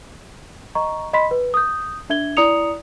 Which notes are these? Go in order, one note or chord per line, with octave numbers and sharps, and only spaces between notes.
D#5 A#5 C#6
D#5 B5 C6 B6
B4
D#6 G6
D4 E5 G#6 G7
E4 D5 A#5 D#6 C#7 F7